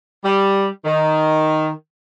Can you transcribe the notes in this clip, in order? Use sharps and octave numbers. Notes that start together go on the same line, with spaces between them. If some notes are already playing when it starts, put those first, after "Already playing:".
G3
D#3